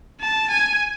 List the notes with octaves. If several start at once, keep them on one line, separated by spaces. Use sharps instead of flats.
A5
G#5